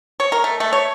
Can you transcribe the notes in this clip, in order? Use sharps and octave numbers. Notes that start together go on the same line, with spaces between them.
C#5
A#4
A3
A3
C#5